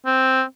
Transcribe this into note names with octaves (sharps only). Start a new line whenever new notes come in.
C4